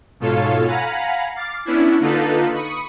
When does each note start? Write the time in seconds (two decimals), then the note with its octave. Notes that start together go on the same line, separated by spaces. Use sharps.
0.20 G#2 B2 F4 A4 C#5 F5
0.67 F5 F#5 G#5 A#5 B5
1.35 D6 F6 A6 C7
1.65 B3 C#4 D4 E4
2.00 D3 A#3 D#4 F4 A4 B4
2.53 B5 C#6 D#6 C#7